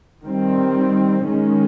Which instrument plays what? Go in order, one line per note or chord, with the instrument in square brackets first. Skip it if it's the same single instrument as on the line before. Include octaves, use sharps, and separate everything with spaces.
[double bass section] D#3 G3 C4
D#3 G#3 C#4